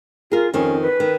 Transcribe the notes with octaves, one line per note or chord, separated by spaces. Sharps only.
F4 G#4 A#4
F2 D#3 C#4
B4
D#3